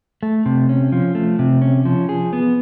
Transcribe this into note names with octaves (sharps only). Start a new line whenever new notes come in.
A3
C3
C#4
F3
A3
C3
C#4
F3
G#4
B3